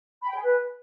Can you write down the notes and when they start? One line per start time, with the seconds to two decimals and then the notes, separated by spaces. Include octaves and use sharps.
0.22 B5
0.28 G5
0.35 G#4
0.42 B4